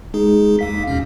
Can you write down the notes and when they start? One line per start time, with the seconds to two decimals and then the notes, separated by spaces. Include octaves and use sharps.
0.14 G#3 D#4 G#4
0.59 D#2 F5 B6
0.87 F#2 B2 C#4